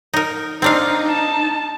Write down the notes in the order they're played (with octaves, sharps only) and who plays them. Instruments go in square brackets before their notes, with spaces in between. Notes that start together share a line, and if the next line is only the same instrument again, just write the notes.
[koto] D#4 A#4
[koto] C4 D4 F5 [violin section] D#4
[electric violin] A5